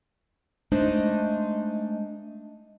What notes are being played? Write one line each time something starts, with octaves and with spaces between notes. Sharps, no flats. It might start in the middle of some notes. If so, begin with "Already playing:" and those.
G#3 A3 D4 D#4 C5 D#5